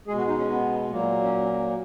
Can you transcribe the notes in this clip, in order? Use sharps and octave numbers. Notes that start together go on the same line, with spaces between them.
B2 G#3 G#4
F#4
D#4
C#4
B3
A#2 F#3 A#3
C#4